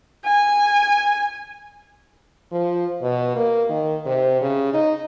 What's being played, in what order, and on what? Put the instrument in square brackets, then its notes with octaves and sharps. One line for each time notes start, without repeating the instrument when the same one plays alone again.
[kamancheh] G#5
[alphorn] F3
B2
A#3
D#3
C3
C#3
D#4